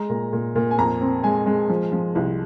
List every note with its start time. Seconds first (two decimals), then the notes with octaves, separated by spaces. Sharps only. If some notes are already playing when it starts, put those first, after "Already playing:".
Already playing: G#3 A#5
0.10 A#2
0.33 A#2
0.55 A#2
0.71 G#5
0.78 F2 A#5
1.01 C4
1.24 G#3 G#5
1.46 G#3
1.69 F3
1.92 F3
2.15 C2